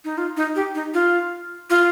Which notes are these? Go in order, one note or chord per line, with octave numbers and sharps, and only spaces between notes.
D#4
F4
D#4
G4
D#4
F4
F4